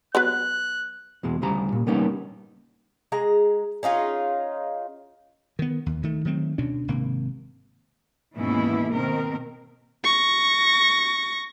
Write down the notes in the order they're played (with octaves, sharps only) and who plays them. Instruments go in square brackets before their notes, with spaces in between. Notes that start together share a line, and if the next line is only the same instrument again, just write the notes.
[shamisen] F#3 B3 B4 [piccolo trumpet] F#6
[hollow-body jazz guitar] E2 B2 G#3
D2 C#3 G3 A#5
A#2
C#3 G3 A#3 B3 C#4 D#4
[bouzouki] G#3 G#4 A#5
C#4 D#4 F4 G#4
[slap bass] D#3 B3
D#2
D2 D#3 A3
D#3 F#3 A3 C4
D2 B2 C#4 D4
G#1 C3 A#3
[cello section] D#2 G#2 B2 E3 C#4 E4
B2 D#3 C4 A#4
[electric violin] C#6 A#6